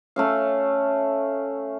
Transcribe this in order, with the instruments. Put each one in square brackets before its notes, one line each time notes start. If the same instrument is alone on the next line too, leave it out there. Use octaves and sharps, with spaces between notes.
[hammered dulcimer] A3 C#4 F5